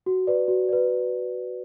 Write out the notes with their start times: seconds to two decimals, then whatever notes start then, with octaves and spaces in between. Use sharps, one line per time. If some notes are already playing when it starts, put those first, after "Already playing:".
0.06 F#4
0.27 B4 D5
0.48 F#4
0.69 B4 D5